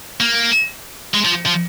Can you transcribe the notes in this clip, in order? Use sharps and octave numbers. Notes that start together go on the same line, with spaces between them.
A#3
G#3
F3
F3